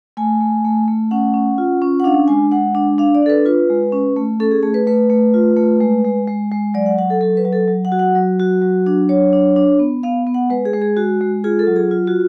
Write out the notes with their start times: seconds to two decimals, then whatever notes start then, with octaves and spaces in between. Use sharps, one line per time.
0.17 A3 G#5
0.40 A3
0.65 A3
0.88 A3
1.11 C#4 F#5
1.34 C#4
1.58 F4
1.82 C#4
2.00 F#5
2.04 D4 F5
2.28 G#3 G#5
2.52 G#3 F#5
2.75 D4
2.98 D4 F5
3.15 D5
3.23 D4 A4
3.30 B4
3.46 F4 B4
3.70 G#3
3.92 C#4
4.16 A3
4.40 C#4 A4
4.51 G#4
4.63 A3 G#4
4.74 B4
4.87 A3 B4
5.10 A3
5.34 F4
5.57 A3
5.81 G#3
6.05 G#3
6.27 G#3
6.52 G#3
6.74 F#3 D5
6.86 F#5
6.98 F#3 F#5
7.10 A4
7.21 F#3 A4
7.37 B4
7.45 F#3
7.53 A4
7.68 F#3
7.85 F#5
7.92 F#4
7.99 F#5
8.15 F#3
8.39 F#4
8.62 F#3
8.86 D4
9.09 F#3 C#5
9.33 D4
9.56 D4
9.79 B3
10.03 B3 F5
10.27 B3
10.34 F#5
10.50 G#3 B4
10.65 G#4
10.74 G#3
10.82 G#4
10.97 G#3 F#4
11.21 G#3
11.44 F4 G#4
11.59 A4
11.67 F#3
11.76 G#4
11.91 F4
12.07 F#4